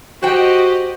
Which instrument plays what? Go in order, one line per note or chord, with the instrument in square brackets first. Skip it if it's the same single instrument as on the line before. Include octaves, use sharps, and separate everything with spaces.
[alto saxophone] F#4 [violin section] G4 D#5 [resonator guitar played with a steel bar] C5 G5